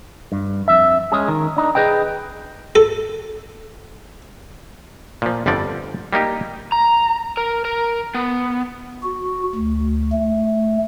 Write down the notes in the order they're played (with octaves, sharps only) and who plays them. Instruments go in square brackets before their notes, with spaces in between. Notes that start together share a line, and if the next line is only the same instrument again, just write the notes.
[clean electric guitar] G2
F2 E5
G#3 C#4 G#4
D#3
D4 D#4
G#4 B4 D#5 G5
[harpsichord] A4
[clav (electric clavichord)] A#2 F3
G1 F2 D3 F3 D5
G3 A#3 D#4 G4
[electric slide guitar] A#5
A#4
A#4
B3
[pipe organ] F#4
D2
A3